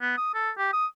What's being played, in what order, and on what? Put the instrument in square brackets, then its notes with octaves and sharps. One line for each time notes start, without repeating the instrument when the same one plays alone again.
[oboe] B3
D#6
A4
G4
D#6